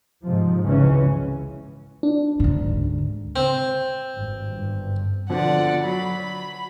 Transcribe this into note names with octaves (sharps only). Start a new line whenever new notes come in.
G#2 C3 F3
G#1 C#2 C#3 E3 C#4
D4
D2 G#2
C4
G#1 G2
G1 G2
B2 D3 F3 D5 F#5
F#3 B5